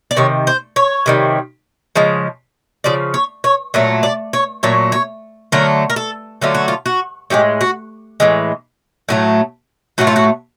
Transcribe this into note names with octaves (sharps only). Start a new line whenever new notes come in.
D5
C3 D#3 C#5
C5
C#5
C3 D#3 G3
C#3 F3 G#3
C#3 F3 D5
C#5
C#5
A#2 F#3 A3
D5
C#5
A#2 F#3 A3 C#5
C#5
D3 F#3 A3 A#4
A#4
A4
D3 F#3 A3 F4
F#4
F4
F#4
A2 E3 G#3 G4
F#4
A2 E3 G#3
A2 F#3 A3
A2 F#3 A3 F#4
F4
F#4